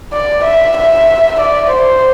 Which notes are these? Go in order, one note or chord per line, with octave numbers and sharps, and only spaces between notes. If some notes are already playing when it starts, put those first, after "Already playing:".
D5
E5
E5
D5
C5